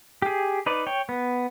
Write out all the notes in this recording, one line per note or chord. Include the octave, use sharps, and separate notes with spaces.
G4 G#4
D#4 B4 D5
C#5 G5
B3